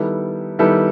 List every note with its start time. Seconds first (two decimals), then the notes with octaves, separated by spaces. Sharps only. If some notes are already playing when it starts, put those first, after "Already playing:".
Already playing: D#3 G3 B3 E4 A4
0.59 D#3 G3 B3 E4 A4